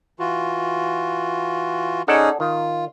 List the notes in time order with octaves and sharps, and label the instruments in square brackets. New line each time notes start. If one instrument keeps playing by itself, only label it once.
[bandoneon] E3 F4 F#4
[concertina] C#4 D#4 G#4 [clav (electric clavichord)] A4 D5 F#5
[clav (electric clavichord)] D#3 [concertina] F4